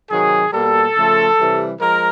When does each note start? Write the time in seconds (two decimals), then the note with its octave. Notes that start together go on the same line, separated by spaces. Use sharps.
0.10 C3 D#3 F#3 G#4
0.53 B2 G3 A#3 A4
0.95 C#3 F3 A3
1.38 C3 E3 G3
1.79 F3 G#3 A#4